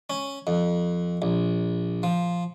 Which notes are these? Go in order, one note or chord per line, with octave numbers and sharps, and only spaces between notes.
C#4
F2
A#1
F3